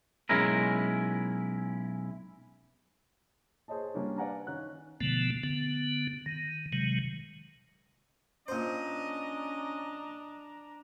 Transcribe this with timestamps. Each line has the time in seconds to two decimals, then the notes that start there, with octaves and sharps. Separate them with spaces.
0.29 B1 G#3 C#4 E4 A#4
3.68 G#4 C5 C#5 D#5 A5
3.95 G3 A#3 C#4 D4
4.18 B4 D5 F5 F#5 G#5 A#5
4.47 D#3 C#4 F#6
5.01 B2 D3 F3 A3 B3
5.43 D3 B3
6.26 D#3
6.73 C3 D#3 F#3 G#3
8.48 A#2 C#4 D4 C5 D#5 A#5